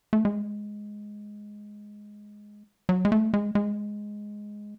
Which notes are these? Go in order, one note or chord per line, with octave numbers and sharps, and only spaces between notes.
A3
G#3
F#3
G#3
A3
G#3
G#3